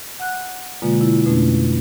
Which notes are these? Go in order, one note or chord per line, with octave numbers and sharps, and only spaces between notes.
F#5 F#6
B2 D3 G#3 A#3 F4
E4
F2 B2 A3 C#4 D4